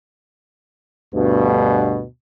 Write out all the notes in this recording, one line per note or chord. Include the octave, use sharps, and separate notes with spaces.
D2 G2 B2